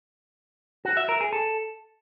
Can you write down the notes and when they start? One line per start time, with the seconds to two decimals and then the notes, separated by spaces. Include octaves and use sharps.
0.85 F#4
0.97 E5
1.09 A#4
1.21 G#4
1.33 A4